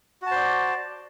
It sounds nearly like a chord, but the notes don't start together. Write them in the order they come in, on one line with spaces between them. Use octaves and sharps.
F#4 A5 C5 D5